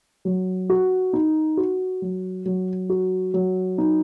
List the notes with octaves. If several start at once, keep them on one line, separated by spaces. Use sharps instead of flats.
F#3
F#4
D#4
F#4
F#3
F#3
F#4
F#3
D#4